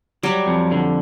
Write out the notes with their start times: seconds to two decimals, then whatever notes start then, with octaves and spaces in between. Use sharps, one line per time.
0.23 F#3 G3
0.47 F2
0.72 D3